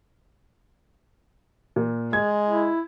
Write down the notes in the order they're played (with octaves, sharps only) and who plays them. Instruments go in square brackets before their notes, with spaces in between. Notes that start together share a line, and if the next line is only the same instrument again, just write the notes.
[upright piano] A#2
[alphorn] G#3 [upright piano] G#6
[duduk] E4